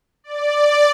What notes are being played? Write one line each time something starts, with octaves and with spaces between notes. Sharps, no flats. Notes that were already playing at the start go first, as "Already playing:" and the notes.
D5